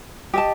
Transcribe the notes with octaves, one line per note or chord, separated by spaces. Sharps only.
G4 D#5 A5